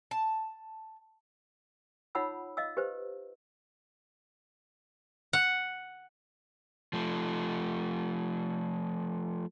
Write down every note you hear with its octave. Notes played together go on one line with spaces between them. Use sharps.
A5
D#4 F4 C#5 F#5 B5 E6
D#5 F5 E6
G4 B4 C5
F#5
F3 A3